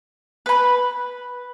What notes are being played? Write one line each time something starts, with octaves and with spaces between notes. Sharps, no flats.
B4 B5